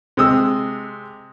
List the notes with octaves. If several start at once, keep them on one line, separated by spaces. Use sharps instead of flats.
C3 G#3 D#6 E6